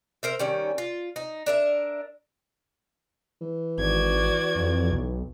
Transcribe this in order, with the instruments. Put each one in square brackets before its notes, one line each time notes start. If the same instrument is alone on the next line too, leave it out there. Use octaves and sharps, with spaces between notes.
[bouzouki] A#4 C5 E5
D#3 G3 C#4
F4
D#4
D4 A#4 E5
[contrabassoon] E3
[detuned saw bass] G#1 [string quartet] F#4 D5 G#6
[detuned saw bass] F2
B1